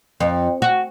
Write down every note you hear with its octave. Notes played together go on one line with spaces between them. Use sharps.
F2
F#4